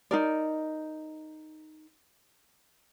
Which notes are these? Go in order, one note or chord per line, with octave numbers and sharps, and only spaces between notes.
D#4 A#4 D5